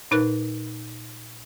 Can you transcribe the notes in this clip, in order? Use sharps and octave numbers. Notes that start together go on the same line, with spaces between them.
A#2 D#4 A#4 B4 F#6